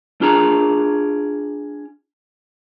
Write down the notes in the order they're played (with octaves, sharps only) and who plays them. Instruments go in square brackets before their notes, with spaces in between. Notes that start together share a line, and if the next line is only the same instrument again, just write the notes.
[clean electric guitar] D4 F4 G#4 A#5